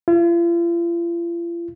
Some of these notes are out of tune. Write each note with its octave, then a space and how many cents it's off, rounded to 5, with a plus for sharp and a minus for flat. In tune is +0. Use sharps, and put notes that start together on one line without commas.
F4 -45